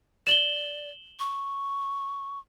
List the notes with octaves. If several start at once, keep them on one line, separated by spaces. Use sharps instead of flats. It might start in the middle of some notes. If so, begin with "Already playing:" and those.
D5 E7 F#7 G7
C#6